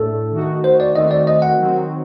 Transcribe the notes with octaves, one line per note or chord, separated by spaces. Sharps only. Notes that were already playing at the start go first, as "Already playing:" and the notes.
Already playing: A2 A3 D4 A4
D#3 A3 D#4 F#4
C5
D5
D#3 A3 C4 F#4 D#5
D5
D#5
F#5
D#3 F#3 C4 F#4